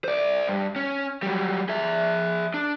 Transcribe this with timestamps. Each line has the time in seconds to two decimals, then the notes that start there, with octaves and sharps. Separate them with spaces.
0.04 C5 D5
0.48 G2
0.76 C#4
1.22 F#3 G3
1.69 G#4 E5
2.54 D4